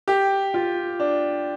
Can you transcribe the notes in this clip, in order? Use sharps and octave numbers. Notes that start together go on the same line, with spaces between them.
G4
F4
D4